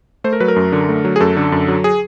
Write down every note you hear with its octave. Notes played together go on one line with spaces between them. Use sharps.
A3 C5
A#4
F#3 B4
A#4
F#2
D3
A3
F#3
G#4
F#2 A4
D3
F#2
F#3
G#4